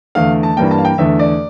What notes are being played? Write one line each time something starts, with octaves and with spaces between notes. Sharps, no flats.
E2 D3 A3 F5
A5
G2 E3 G3 A#3 G5
A5
F5
G5
E2 D3 A3 E5
D5